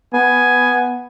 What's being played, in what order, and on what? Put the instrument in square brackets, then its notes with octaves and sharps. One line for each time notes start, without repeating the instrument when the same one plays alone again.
[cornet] B3 [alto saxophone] G#5